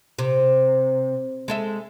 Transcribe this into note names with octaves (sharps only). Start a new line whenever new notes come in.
C3
G#3 A4 E5